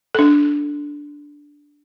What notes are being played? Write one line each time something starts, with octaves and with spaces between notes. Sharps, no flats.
D4 A4